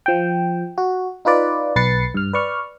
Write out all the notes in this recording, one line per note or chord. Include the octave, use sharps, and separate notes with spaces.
F3 G5
F#4
D#4 F4 B4 D5
B1 B4 A6 C7 C#7
G2 F6
B4 D5 C#6 F6